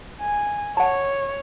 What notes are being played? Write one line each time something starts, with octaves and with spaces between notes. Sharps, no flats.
G#5
C#5 F#5 A5